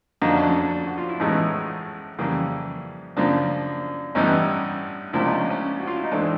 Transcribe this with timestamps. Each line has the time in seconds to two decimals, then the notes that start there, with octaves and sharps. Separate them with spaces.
0.21 F2 D3 F#3 A#3 D#4
0.29 D4
0.36 C#4
0.44 D4
0.87 F#4
0.98 F4
1.09 E4
1.20 A1 A2 E3 G#3 B3 C#4 D#4
2.19 F2 C#3 E3 G3 A#3
3.17 F#2 C#3 F3 A#3 D4
4.15 A1 G2 E3 G3 B3 C#4 D#4
5.13 C#2 C3 F3 A#3 D4 E4
5.25 C#4 D#4
5.38 C#4
5.50 C#4
5.80 F#4
5.87 F4
5.96 E4
6.04 D#4
6.12 G#1 G#2 E3 A3 D4